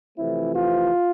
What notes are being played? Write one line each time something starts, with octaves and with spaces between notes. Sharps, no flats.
F2 C3 E3 A3 C4 E4
F4